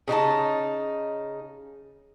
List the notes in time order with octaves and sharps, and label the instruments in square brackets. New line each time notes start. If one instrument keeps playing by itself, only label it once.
[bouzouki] C#3 D#4 F#4 A5